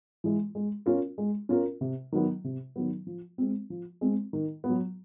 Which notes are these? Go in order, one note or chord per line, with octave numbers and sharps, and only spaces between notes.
E3 G#3
G#3
C#4 F4 A#4
G#3
C#4 F4 A#4
C3
D#3 F#3 B3
C3
D#3 F#3 B3
F3
G#3 C4
F3
G#3 C4
D#3
B3
F#3